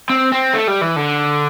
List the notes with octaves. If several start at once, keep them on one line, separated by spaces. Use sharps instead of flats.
C4
C4
A3
G3
E3
D3